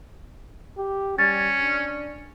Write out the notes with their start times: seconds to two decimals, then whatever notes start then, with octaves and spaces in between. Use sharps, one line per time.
0.78 G4
1.18 G3 C#4 G#6 A6
1.60 D4